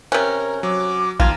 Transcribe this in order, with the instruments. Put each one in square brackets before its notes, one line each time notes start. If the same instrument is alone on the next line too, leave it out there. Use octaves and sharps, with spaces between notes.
[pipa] C3 C#4 [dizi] A#4 [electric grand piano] F#6
[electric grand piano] F#3 [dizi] D6
[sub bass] A#1 [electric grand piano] D#2 A#5 G#6 [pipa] F4